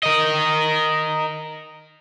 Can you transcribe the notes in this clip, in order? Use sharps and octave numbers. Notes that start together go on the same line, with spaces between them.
A#4 D#5